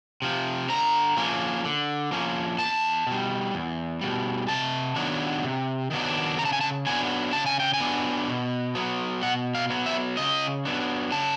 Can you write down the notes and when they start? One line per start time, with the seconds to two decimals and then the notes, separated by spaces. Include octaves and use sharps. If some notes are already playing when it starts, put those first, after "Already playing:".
0.22 C3 F3
0.69 D3 A#5
1.17 F3 A#3 C#4
1.65 D3
2.12 F3 A#3 C#4
2.59 E2 A5
3.07 B2 G3
3.54 E2
4.01 B2 G3
4.48 C3 A5
4.96 D#3 F#3 B3 D4
5.44 C3
5.91 D#3 F#3 B3 D4
6.39 C#3 A#5
6.45 A5
6.53 G#5
6.61 A5
6.86 F#3 B3 D4 G#5
7.33 C#3 A5
7.46 G#5
7.60 G5
7.74 G#5
7.80 F#3 B3 D4
8.28 B2
8.75 F#3 B3
9.22 B2 F#5
9.55 F5
9.70 F#3 B3
9.86 E5
10.17 C#3 D#5
10.65 F#3 B3 D4
11.12 C#3 A5